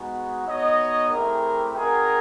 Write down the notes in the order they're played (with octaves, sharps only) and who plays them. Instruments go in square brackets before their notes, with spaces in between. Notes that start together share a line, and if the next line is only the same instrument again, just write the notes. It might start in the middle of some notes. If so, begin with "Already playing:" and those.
Already playing: [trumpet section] G#3 B3 D#4 F#4
B3 D#4 F#4 C#5 D#5
A3 C4 E4 G4 G#4 A#4
C4 D#4 F#4 G#4 A#4